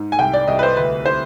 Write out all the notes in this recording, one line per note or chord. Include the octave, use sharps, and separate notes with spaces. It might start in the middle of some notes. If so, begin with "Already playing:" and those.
Already playing: G#2
G#5
C2 G5
D5
C2 D#5
B4
C5
D2 B4
C5